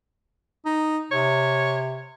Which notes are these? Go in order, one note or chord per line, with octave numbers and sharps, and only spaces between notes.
D#4
C3 C#5